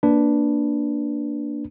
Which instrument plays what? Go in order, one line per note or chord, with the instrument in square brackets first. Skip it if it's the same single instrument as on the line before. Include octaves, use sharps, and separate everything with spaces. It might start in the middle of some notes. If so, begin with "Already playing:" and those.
[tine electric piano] A#3 D4 B4